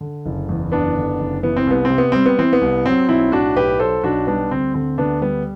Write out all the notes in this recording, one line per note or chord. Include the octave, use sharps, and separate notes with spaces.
D3
F#1
E2
F#1 B3 D4
D3
F#1
E3 B3
C4
C2 B3
C4
C3
B3
G3 C4
B3
E3 C4
B3
C2
F#3 C4
B1 C4 E4
A2 D4 F#4
B1 G4 B4
F#3 A4 C5
B1 D4 F#4
G3 B3 D4
D2 C4
D3 C4
D2 B3 D4
G3 B3